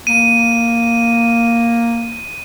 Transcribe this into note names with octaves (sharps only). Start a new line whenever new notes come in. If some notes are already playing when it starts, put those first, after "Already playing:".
A#3 D#7